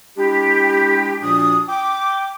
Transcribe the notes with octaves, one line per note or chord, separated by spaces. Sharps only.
G#3 D4 E4 G4
A#2 F3 D4 F#4 D#6
G5 D6